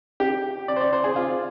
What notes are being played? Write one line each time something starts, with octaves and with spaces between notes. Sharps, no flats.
G4
D5
C5
D5
C5
G#4
F4